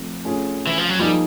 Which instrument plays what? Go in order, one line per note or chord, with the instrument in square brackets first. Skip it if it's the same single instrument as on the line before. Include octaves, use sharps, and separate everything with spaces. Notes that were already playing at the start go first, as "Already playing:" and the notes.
Already playing: [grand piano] F3 A3 C4
A3 C#4 F4 G#4
[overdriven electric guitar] E3
F3
F#3
[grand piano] F3 A#3 D#4 G#4 [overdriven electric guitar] G3